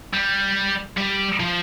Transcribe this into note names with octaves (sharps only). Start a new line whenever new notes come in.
G3
G3
F3